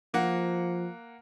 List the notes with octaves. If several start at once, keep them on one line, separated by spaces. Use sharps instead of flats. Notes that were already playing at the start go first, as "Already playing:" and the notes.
F3 A#3 F#5